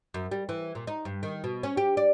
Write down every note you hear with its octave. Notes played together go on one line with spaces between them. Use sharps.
F#2
G3
E3
A#2
D#4
G2
D#3
B2
C#4
G4
D5